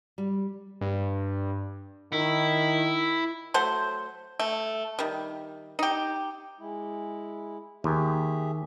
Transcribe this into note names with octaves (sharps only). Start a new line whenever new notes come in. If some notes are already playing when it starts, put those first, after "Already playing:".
G3
G2
D#3 E4
F#3 A3 C5 C6
A3
D#3 G3
D#4 G4
G#3 E4
D#2 G4 G#4 E5